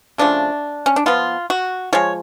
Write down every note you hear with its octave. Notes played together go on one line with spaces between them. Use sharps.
C#3 F3 A3 D4
C#4
D4
F3 B3 F4
F#4
F3 G#3 C#5